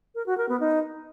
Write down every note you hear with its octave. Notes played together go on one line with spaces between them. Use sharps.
A#4
F#4
A#4
B3
D#4